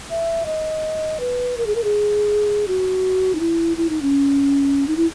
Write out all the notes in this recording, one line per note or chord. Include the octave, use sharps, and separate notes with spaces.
E5
D#5
B4
A#4
G#4
A#4
G#4
F#4
D#4
E4
E4
D#4
C#4
D#4
E4